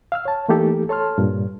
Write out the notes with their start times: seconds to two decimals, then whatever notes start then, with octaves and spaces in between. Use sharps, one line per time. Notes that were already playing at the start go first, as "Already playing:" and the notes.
0.12 F5 E6 F6
0.25 C#5 A5
0.49 E3 A3 A#3 D#4 G4 A4
0.89 A4 C#5 A5 C6 F6
1.18 G2 A#2